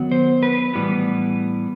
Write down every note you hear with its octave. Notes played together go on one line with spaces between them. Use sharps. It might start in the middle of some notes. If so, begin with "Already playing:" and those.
Already playing: D#3 F#3 B3
C5
B4
A2 E3 G3 B3